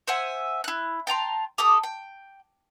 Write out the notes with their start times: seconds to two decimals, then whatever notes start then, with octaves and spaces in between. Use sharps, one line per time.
0.08 C5 E5 F#5 G#5
0.64 E4 F#6
1.07 G5 A5 A#5 C6
1.58 G4 A4 D6 D#6
1.83 G5